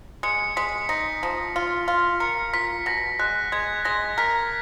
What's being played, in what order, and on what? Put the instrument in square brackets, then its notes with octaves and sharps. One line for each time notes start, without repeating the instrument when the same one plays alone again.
[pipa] G#3 [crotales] C#7
[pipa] G#3 [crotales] B6
[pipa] D#4 [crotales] A#6
[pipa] F3
F4
F4
[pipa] A#4 [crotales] C#7
[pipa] F4 [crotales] B6
[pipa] B2 [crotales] A#6
[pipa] G#3 [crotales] F#6
[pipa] G#3 [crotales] G#6
[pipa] G#3 [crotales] A#6
[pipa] A#4 [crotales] B6